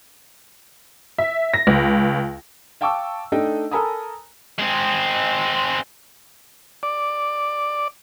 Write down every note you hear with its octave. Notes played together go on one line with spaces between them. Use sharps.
E5
A#6
C#2
F5 G5 A5 C#6 D6 E6
A3 D4 D#4 D#5 G5
A4 A#4 G#5 A#5 B5 D#6
G#3 C4
D5